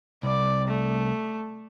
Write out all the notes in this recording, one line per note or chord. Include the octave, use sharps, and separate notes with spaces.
C2 D5
A3